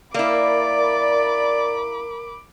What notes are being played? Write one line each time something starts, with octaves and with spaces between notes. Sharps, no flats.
A#3 E4 A#4 D5 B5 D6